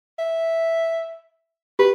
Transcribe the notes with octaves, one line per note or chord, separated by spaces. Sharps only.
E5
G4 B4